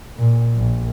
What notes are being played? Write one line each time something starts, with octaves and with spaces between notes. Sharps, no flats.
A#2
A#1